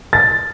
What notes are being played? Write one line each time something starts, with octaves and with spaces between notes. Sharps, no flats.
A6